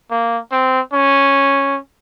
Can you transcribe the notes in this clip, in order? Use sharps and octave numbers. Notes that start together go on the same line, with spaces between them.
A#3
C4
C#4